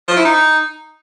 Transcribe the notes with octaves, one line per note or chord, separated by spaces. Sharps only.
F3
E4
D#4